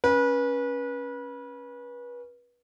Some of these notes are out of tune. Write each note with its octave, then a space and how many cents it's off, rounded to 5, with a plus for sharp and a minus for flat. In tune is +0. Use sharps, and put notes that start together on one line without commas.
C#4 +0 B4 -30